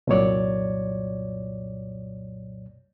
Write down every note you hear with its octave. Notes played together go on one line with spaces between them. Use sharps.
C2 F#2 A#2 F#3 C#5 D5